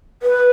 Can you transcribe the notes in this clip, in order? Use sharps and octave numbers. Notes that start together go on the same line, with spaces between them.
B4